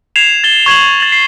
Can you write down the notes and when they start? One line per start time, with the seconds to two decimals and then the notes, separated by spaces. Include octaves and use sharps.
0.16 G#6 C7 E7 F7
0.44 A6 G7
0.66 C#6 G#6 E7 F#7
1.00 A6 F#7
1.12 C7